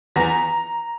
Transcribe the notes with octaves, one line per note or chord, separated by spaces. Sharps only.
E2 A#5 A#6